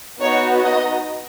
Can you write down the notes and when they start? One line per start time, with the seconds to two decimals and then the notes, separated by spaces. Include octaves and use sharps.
0.20 B3 D#4 F#4 C#5
0.64 D#5